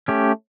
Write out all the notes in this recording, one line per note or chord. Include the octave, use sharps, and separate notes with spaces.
A3 C#4 G4